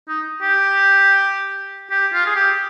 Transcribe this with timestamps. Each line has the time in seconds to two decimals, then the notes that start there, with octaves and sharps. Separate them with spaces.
0.08 D#4
0.42 G4
1.91 G4
2.13 F4
2.26 G#4
2.35 G4